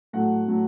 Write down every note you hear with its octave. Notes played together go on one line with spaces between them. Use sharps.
A2 F#3 A3 F#5
A2 F#3 A3